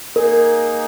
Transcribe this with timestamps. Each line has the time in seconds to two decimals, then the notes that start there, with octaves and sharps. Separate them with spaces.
0.16 A#3 D#4 G#4 A#4